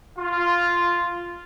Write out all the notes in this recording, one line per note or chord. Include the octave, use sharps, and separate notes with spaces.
F4